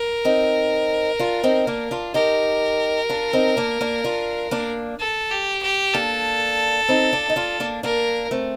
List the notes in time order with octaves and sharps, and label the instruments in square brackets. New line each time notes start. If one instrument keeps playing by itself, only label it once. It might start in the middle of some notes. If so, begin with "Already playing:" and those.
Already playing: [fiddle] A#4
[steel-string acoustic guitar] C4 D#4
D4 F4
C4 D#4
A#3 D4
D4 F4
[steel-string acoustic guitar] D#4 G4 [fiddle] A#4
[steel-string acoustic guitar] D4 F4
C4 D#4
A#3 D4
A#3 D4
D4 F4
A#3 D4
[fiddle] A4
G4
G4
[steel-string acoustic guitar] A#3 D4 [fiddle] A4
[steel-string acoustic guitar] C4 D#4
D4 F4
D#4
D4 F4
A#3 D4
[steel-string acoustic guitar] A#3 D4 [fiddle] A#4
[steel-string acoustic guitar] A3 C4